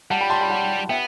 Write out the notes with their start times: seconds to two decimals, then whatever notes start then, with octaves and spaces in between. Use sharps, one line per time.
0.10 G3 F#5 A5
0.21 G5 B5
0.30 A5 C6
0.41 G5 B5
0.50 F#5 A5
0.89 B3 E5 G5